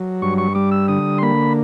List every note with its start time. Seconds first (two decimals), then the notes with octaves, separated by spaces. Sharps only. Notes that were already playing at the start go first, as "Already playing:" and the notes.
Already playing: F#3
0.22 G2 C#6
0.38 C#6
0.55 G3 D6
0.71 E6
0.88 D3 D#6
1.18 C6
1.22 A#3 B5